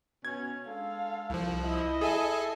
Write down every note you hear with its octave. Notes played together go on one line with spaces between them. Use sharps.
B2 C#4 G#6
G#3 D4 A4 F5
C2 F3
E4 D#5
G#4 A4 E5 G#5 A5